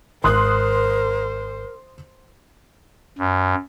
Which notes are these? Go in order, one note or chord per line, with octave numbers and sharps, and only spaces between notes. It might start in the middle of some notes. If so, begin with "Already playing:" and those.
G#1 A#4 C5 C6 D#6 F#6
F#2